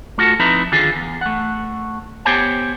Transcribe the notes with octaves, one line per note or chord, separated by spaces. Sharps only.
A3 F4 F#4 A4
F3 C4 D#4 E4 B4 A#5
D3 D#3 F4 G#4
E2
A3 F#5
B3 G4 C5 C#5 G5 G#5